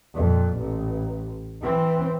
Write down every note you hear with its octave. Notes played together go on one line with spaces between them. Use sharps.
F2 A#2
A1
E3 C4